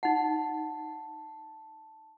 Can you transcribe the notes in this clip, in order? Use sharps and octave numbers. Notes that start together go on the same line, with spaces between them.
D#4 F#5 A5